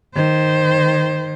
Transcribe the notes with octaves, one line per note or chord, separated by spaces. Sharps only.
D#3 C5